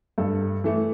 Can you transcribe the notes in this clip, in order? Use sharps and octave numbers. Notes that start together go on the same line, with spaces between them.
G2 A4
E3 A3